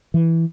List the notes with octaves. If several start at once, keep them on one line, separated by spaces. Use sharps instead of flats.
E3